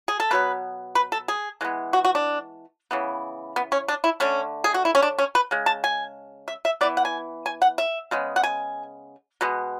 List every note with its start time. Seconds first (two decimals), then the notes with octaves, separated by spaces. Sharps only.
0.08 G#4
0.20 A4
0.31 B2 F#3 B3 B4
0.95 B4
1.12 A4
1.28 G#4
1.61 E3 G#3 B3
1.93 F#4
2.05 F#4
2.15 D4
2.91 C#3 E3 B3
3.56 B3
3.72 C#4
3.88 D4
4.04 E4
4.20 D3 A3 C#4
4.64 G#4
4.74 F#4
4.85 E4
4.95 C#4
5.02 D4
5.18 C#4
5.35 B4
5.51 C#3 G#3
5.66 A5
5.84 G#5
6.48 E5
6.65 E5
6.81 E3 B3 D5
6.97 F#5
7.05 G#5
7.46 G#5
7.62 F#5
7.78 E5
8.11 C#3 G#3 B3
8.36 F#5
8.43 G#5
9.41 B2 G#3 B3